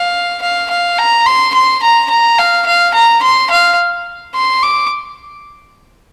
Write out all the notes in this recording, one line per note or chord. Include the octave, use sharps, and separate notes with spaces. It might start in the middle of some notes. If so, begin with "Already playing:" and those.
Already playing: F5
F5
F5
A#5
C6
C6
A#5
A#5
F5
F5
A#5
C6
F5
C6
D6